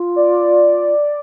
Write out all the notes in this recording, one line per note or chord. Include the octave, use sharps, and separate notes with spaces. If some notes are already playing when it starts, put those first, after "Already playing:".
Already playing: F4
D5